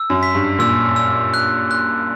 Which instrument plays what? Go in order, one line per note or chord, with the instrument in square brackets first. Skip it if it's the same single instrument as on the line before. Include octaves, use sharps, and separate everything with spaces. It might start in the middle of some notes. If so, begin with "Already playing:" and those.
Already playing: [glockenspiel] E6
[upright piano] F#2
[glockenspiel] B6
[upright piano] G2
[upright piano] A#2 [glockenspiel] E6
[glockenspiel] E6
F#6
F#6